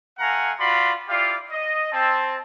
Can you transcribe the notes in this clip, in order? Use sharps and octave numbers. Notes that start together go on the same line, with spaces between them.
A3 F5 F#5 G#5 A#5
F4 F#4 D5 F5 B5 C6
E4 F4 G4 D5 F5
D#5
C4 A5